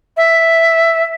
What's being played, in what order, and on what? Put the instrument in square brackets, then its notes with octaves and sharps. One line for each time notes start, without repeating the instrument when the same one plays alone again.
[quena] E5